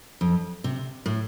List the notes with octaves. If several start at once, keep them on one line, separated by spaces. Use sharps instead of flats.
F2
C3
A2